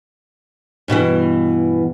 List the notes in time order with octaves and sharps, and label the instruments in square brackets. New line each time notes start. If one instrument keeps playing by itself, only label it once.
[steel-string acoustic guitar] G2 B2 D3 E3